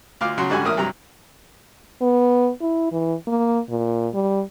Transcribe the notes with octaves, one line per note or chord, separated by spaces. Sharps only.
D2 F4 F5 D6 F6
C#3 F#3 F#4 C6
G#2 D3 G3 C#4 F#4 G#5
A1 A#3 E4 D#6 F6
G2 C3 F#3 A#5
B3
E4
E3
A#3
A#2
G3